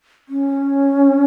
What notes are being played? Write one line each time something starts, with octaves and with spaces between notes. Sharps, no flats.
C#4